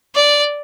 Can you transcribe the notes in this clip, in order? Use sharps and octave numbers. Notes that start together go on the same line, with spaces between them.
D5